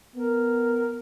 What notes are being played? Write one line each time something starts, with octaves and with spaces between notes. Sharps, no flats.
B3 A#4